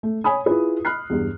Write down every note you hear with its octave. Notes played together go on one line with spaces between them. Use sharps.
A3
C#5 G#5 B5 D#6
E4 F4 G#4 B4
B5 F6 F#6 C7
E2 G2